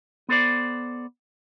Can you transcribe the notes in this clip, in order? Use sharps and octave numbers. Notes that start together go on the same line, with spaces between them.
B3 A4 C5 D5